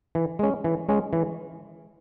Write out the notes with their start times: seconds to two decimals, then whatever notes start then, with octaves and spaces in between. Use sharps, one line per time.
0.15 E3
0.39 G#3 C#4
0.64 E3
0.89 G#3 C#4
1.13 E3